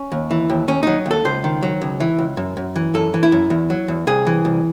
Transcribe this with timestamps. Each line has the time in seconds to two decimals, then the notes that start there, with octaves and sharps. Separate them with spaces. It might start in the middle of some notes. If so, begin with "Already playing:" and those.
Already playing: C#4
0.12 D#2
0.31 E3
0.50 D#2
0.68 D#2 C#4
0.83 F#3 D#4
1.06 D#2
1.11 A4
1.25 C#2 C5
1.44 D#3
1.63 F#3
1.82 C#2
2.00 E3
2.19 C#2
2.37 F#2
2.57 F#2
2.76 E3
2.94 F#2 A4
3.14 E3
3.23 E4
3.32 F#2
3.50 E2
3.70 F#3
3.88 E2
4.07 C2 G#4
4.27 E3
4.45 C2